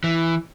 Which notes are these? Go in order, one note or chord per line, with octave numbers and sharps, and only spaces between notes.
E3